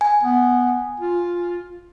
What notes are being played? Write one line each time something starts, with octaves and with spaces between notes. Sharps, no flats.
G#5
B3
F4